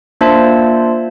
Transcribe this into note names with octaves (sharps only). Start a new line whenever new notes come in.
A#3 D4 F4 C5 E5 A5